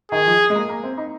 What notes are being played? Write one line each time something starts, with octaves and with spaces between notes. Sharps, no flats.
D#3 G#4
F3
G#3
A#3
A#3
C4
D#4